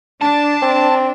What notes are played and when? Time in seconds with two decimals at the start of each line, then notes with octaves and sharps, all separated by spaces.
0.22 D4 A5
0.62 C4